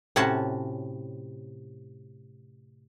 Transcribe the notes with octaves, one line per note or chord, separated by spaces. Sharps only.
A2 C3 C#4 F#4 A5